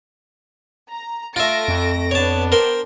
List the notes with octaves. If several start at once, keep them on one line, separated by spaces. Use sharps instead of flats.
A#5
A3 F4 E5 A#6 D7
F2
B3 D4 C#5 A5
A#4 C5 G5